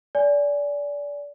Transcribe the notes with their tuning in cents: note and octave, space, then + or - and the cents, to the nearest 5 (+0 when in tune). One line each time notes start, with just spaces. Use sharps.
D5 -25 G#5 +0